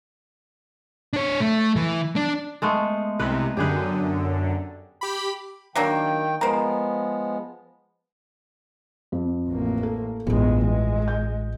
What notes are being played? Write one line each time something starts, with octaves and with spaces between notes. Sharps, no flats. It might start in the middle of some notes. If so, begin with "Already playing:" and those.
D4 C#5
A3
E3
D4
G#3 A3 B3
C2 C3 B4
F#2 D3 G4 G#4 B4
G4 B5
D#3 F#3 A#3 D4 G5
F3 G#3 B3 A#4 C5
F2
A1 A#3
A4
A1 E2 G2 G#3 F4
E3 G#3
G6